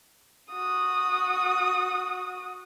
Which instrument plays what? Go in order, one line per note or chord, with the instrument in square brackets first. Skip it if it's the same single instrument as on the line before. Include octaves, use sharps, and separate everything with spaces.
[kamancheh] F#4 D#6